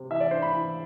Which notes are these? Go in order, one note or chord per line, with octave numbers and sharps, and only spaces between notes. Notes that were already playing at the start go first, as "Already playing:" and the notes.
Already playing: C3
E3 E5
D5
D4 C5
B5
E3